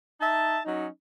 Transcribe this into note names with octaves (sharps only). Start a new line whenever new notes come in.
D#4 E5 A5
F#3 C#4 D#4